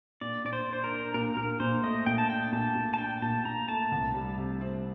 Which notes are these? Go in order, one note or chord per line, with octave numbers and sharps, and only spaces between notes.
A#2 D5
A#2 D5
C5
D4 C5
A#4
D4
A#2 A#4
A#2 A#4
A#2 C5
A3 D#5
A#2 G5
A5
D4 G5
A#2 A5
A#2
A5
D4 G5
A#2 A5
A#2 A#5
A3 A5
C2
G3
C3
C4